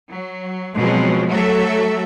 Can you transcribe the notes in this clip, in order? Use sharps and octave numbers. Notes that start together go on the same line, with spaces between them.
F#3
B2 F3 F#3 G#3 C4
F#3 A3 F#4 A4 E5